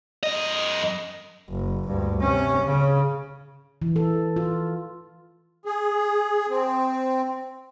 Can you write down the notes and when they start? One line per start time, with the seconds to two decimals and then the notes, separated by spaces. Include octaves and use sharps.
0.23 F#2 D#5
1.49 F#1
1.87 D2 G2
2.21 C3 C#4
2.65 C#3
3.82 E3
3.96 A4
4.36 F4
5.65 G#4
6.50 C4